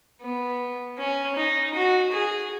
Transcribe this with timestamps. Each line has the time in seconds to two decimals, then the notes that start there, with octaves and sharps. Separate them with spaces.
0.22 B3
0.98 C#4
1.36 D#4
1.74 F#4
2.12 G#4